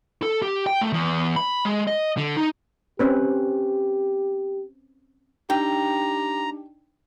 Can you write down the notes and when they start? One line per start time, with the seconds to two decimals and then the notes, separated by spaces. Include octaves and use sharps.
0.23 A4
0.42 G4
0.67 G5
0.81 A3
0.93 E2
1.36 B5
1.65 G#3
1.87 D#5
2.17 D3
2.37 D#4
2.99 C4 C#4 G4 B4
5.50 D4 D#4 G4 G5 A#5